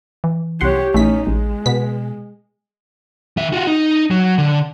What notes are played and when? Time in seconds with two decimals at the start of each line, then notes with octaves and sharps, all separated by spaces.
0.24 E3
0.61 C2 G4 C#5 F#5 C6
0.94 A#1 E3 A3 C#4 D#4 B6
1.27 A1 G#3
1.66 B2 B3 B6
3.37 D#3 E5
3.53 F4 F#4
3.67 D#4
4.10 F#3
4.38 D3